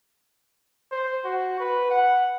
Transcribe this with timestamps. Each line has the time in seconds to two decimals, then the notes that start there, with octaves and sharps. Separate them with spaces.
0.92 C5
1.25 F#4
1.60 B4
1.90 F#5